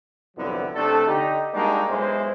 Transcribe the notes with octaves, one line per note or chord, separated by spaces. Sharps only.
C2 F2 D3 F#3 B3 E4
B1 C3 A3 D4 A4
D3 D#4 G4
G3 G#3 A#3 D4 D#4 F#4
B1 G#3 B3 E4 C5